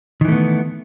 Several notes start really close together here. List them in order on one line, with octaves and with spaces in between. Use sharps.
D#3 E3 A3 B3